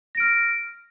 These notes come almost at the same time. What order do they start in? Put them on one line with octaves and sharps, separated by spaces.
A#6 D7 F6